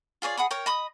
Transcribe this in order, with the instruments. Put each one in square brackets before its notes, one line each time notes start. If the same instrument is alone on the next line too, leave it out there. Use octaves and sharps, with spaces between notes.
[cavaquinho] F4 G#4 C#5 D5
G#4 F#5 B5 D#6
A#4 C#5 G5
D#5 B5 D#6